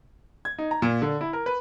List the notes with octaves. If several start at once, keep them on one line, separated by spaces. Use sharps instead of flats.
G#6
D#4
A#5
A#2
D3
E4
A#4
B4